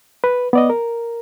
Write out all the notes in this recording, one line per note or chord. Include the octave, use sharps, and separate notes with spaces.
B4
B3 D5 D#5
A#4